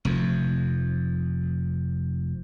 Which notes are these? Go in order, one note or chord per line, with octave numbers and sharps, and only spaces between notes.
F1 F2